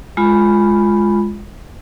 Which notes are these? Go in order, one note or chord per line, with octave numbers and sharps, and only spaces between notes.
G#3 F4 B5